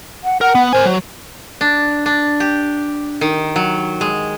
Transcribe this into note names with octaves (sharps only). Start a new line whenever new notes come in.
F#5
A#4 F#5
B3
A#4 C5 G#5
F#3
D4
D4
G4
D#3
F#3
G#3